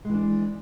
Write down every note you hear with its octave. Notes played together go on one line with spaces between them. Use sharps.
E3 G#3 D4